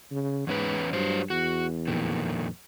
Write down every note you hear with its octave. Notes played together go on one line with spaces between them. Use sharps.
C#3
E2 G#2 C#4 B4
G2 F#3 C5
E2 F#4
F2 A#2 D#3